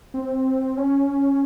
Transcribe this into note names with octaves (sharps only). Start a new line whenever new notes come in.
C4
C#4